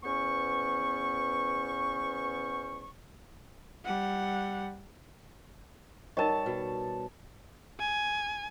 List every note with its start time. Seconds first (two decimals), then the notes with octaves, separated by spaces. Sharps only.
0.04 E2 B3 C#4 C5 C#6
3.85 G3 F#5
6.17 G3 D#4 A#4 C#5 D#5 A5
6.46 B2
7.80 G#5